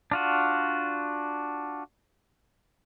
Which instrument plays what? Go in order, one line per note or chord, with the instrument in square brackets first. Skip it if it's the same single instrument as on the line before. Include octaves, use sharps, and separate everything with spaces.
[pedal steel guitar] D4 F4 F#4